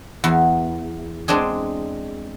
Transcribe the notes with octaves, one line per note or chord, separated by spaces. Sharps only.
E2
G#3 C4 D4 G#4